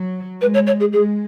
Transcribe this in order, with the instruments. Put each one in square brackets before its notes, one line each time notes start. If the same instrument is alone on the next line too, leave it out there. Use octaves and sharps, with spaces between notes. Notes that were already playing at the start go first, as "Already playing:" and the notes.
Already playing: [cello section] F#3
[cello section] G#3 [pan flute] B4
[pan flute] C#5
C#5
G#4
[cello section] G#3 [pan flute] G#4